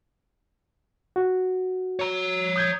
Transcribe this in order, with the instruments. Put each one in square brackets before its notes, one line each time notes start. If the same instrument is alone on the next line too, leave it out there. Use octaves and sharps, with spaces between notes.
[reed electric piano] F#4
[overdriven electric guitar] C#5 A#5
[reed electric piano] D#6 G6 G#6